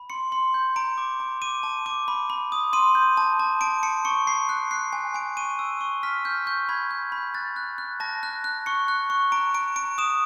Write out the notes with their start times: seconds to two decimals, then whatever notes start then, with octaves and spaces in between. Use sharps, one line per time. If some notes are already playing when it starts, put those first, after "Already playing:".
Already playing: B5
0.10 C6 C#7
0.32 C6
0.54 G6
0.76 A#5 D7
0.98 D6
1.20 A#5
1.42 D6 D#7
1.63 A5
1.86 D6
2.08 B5
2.30 B5
2.52 D#6
2.73 C6 D#7
2.95 G6
3.17 A5
3.40 A5
3.61 A5 D7
3.83 A5 C#7
4.05 C#6 C#7
4.27 A5 C7
4.49 F#6
4.71 F#6 C7
4.93 G#5
5.14 G#5 D7
5.37 C#6 D#7
5.59 E6
5.81 C#6
6.03 F6 B6
6.25 F6 G6
6.46 C#6 G6
6.69 B5 G#6
6.91 G6
7.12 B5
7.34 F#6 A6
7.56 F#6
7.78 F#6
8.00 A5 A#6
8.23 F#6
8.44 F#6
8.66 C#6 C#7
8.88 F#6
9.10 C#6
9.32 A#5 D7
9.54 A#5 D7
9.76 A#5 D7
9.98 D#6 E7